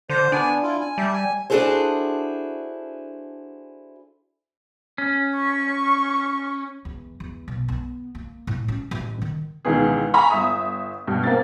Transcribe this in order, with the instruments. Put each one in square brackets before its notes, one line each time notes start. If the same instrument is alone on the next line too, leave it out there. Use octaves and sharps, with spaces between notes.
[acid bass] D3 [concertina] C5
[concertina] B3 G#5 [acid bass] D4
[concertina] E4 F4
G#5
[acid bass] G3 [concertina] E5 A5
[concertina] G#5
[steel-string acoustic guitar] D4 E4 F#4 G#4 A4 C5
[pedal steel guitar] C#4
[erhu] C#6
[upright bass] E2
E2
B1
B3
A#3
A2
C#4
A1
D#3
[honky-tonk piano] C#2 B2 D#3 E3 B3 G#4
G#5 A#5 B5 C#6
G1 E5 D#6
G2 B2
A#3 C4 A6